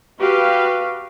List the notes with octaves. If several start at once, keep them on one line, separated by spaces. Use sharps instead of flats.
F#4 G4 B4 F5